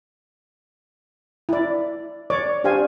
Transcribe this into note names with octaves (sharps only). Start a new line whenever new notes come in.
E4 D5
C#5 D5 D6
D4 G4 C5 F5 G#5